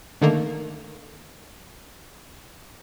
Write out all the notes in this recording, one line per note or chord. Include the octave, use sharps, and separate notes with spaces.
D3 D#3 A3 A#3